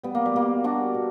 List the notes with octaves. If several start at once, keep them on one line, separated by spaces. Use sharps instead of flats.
G3 B3
A#3
G3
B2 A#3
G3 D4 F#4
B2